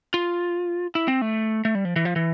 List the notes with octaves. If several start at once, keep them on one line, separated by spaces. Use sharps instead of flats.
F4
E4
C4
A3
A3
G3
F3
E3
F3
E3